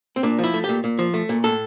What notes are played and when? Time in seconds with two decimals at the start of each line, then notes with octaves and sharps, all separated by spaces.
0.16 C4
0.23 A#2 D4
0.39 F3
0.44 E4
0.54 A3
0.64 G4
0.69 A#2
0.84 A#2
0.99 F3
1.14 A3
1.29 A#2
1.44 A2 A4